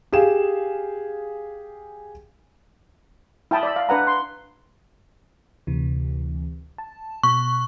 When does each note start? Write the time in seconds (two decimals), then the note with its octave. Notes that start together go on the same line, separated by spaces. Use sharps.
0.13 G4 G#4 F5 E7
3.51 E4 G5 A5 B5 D#6
3.63 D5 B5 E6
3.76 F5
3.89 D4 B4 F#5 A#5
4.07 C6
5.67 D2 C3 E3
6.78 A5
7.23 B2 C#6 F#6